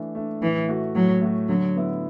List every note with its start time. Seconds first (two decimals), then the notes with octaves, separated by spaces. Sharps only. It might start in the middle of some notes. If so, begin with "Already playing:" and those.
Already playing: E3 A3 D4
0.15 A3 D4
0.41 A2 E3
0.69 A3 F#4
0.95 A2 F#3
1.21 A3 F#4
1.48 D3 F#3
1.76 B3 E4